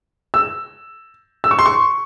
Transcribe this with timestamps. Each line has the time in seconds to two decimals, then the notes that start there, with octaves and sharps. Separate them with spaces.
0.34 E6
1.44 E6
1.51 C#6
1.59 C6
1.66 C#6